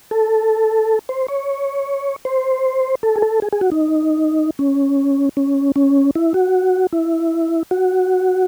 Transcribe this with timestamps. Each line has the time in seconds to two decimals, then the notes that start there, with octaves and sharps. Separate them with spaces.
0.11 A4
1.09 C5
1.28 C#5
2.25 C5
3.03 A4
3.16 G#4
3.22 A4
3.42 G#4
3.53 G#4
3.61 F#4
3.72 D#4
4.59 C#4
5.37 C#4
5.76 C#4
6.15 E4
6.34 F#4
6.93 E4
7.71 F#4